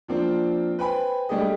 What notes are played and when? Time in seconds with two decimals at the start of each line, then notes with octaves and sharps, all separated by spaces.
0.08 F3 A#3 C4 D4 F4
0.79 B4 C5 G5 G#5 B5
1.29 G3 A3 D4 G4 G#4 D#5